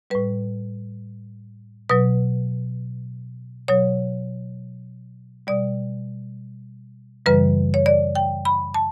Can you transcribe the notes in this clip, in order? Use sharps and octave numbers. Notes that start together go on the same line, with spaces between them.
A2 G3 B4
B2 F#3 B4
B2 F#3 C#5
B2 G3 D5
F#2 C#3 E3 G3 B4
C#5
D5
G5
B5
A5